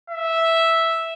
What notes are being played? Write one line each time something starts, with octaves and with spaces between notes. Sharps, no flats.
E5